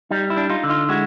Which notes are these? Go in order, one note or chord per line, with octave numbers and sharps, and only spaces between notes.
G3 D#4
E4
D4
D#4 F4
D3
D#4 F4
G#3 E4 F#4